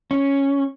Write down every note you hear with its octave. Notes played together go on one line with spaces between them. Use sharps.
C#4